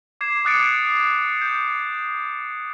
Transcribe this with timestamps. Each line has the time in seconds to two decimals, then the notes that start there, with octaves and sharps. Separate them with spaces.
0.21 D6 G#6 C7 E7
0.45 D6 D#6 F#6 A6 C#7 D7
1.42 G6